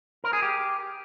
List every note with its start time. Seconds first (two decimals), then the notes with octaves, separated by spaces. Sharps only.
0.24 A#4
0.33 G#4
0.42 G4